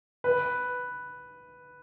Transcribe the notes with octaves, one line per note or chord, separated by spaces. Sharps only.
B4